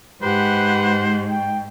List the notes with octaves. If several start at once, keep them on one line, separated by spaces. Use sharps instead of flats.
G#2 G4 B4 C5 F#5
G5